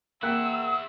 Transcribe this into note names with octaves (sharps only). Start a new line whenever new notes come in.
A#3 E4 E5 F#5 G5 E6 F#6